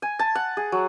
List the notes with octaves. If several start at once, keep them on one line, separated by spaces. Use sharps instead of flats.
G#5
A5
F#5
G#4
F#3